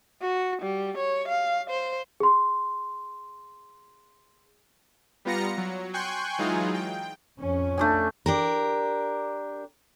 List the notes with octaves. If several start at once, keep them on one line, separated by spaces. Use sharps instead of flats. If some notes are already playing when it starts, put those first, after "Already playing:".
F#4
G3
C#5
F5
C5
G#4 C6
G3 B3 F4 A#5 A#6 C#7
F#3
G5 G#5 C6 C#6 F#6 G6
E3 F#3 G#3 D#4 F4 G#4
G5
F2 C#4
A3 D4 G#5
D4 G4 A#4